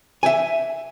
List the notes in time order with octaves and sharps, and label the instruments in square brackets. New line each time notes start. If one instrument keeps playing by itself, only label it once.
[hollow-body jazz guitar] E5 G#5